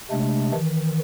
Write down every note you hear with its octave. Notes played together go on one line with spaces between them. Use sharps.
C3 G#3 A3 D4
D#3 E3